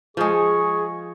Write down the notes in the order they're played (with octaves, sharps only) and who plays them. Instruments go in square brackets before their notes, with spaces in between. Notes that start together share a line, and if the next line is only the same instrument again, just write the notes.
[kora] F3 G#3 [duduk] G#4 [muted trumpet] C#6